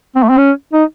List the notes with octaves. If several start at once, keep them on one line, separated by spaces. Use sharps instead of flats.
C4
A3
C4
C#4
D#4